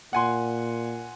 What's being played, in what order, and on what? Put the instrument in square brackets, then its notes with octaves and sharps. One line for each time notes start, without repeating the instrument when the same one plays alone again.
[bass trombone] A#2 [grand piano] F#5 G#5 C6